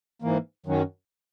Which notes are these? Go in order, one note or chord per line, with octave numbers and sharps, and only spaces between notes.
G#2 E3 A#3
F#2 D#3 F#3 C#4